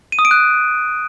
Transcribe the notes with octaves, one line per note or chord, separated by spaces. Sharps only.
D#7
D#6
D7
F#6